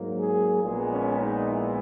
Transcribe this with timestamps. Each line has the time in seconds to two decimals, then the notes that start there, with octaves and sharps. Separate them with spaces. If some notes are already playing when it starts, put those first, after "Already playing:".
Already playing: G#2 F#3 A#3
0.20 G#4
0.63 A#1 A#2 G#3 B3 G#4
0.92 C#4
1.21 D#4
1.49 E4